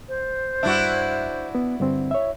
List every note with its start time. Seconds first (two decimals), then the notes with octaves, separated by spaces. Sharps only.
0.08 C5
0.63 G2 D4 E4 F#4 E5
1.55 B3
1.79 G2 D3 C4
2.11 C#5 E5